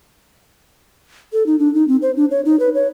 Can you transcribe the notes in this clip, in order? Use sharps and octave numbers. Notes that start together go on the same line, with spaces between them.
A4
D#4
D4
D#4
C4
C5
D4
C#5
D#4
B4
C#5